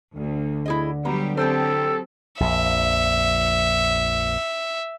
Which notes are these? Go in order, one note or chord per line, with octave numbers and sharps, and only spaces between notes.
D2 D3
E4 G#4 D#5
F#3 G3 B3 G4 A#5
F#3 C4 G4 A4 C5 G5 A5
A#1 F2 E5